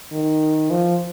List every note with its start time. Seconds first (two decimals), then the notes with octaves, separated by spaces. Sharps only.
0.13 D#3
0.70 F3